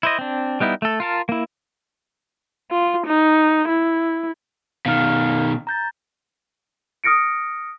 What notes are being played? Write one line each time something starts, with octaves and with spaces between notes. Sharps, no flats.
E4 C5 D#5
C4 D4
G3 B3 D#4 E4
A3 A4
F4 A#4 A5
A#3 E4
F4
D#4
E4
B2 D#3 F5 F6
A#5 G6 A6
D#6 F6 A#6 C#7 D7